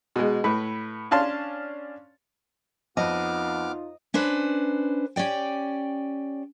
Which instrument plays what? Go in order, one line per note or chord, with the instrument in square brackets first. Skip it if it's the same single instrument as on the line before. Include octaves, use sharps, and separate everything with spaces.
[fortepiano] B2 G#3
A2 B4
C#4 D4 F5 A5 C6
[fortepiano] F2 [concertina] B3 D6 F6 [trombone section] D#4 F4 [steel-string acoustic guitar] D#5
[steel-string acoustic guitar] C#4 D4 B4 C5
C#4 G4 D5 G5